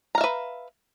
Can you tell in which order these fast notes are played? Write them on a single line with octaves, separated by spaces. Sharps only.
A#5 F5 E5 B4